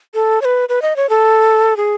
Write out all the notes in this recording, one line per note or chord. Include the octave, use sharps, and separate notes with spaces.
A4
C#5
B4
B4
D#5
C#5
A4
G#4